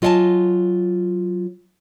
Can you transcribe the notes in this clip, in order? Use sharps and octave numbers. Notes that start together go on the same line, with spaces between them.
F#3 F4 D#5 F#5 G#5 A5